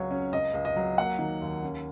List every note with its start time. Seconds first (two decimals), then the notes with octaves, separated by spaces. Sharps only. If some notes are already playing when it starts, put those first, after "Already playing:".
Already playing: C#2 F#3 C#5
0.11 C#4
0.33 C#2 D#5
0.54 C#2
0.65 D#5
0.76 F#3
0.98 A#3 F#5
1.19 D#3
1.42 D#2
1.63 C#4